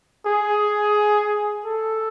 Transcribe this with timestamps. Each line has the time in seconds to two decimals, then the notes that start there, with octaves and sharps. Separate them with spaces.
0.26 G#4
1.65 A4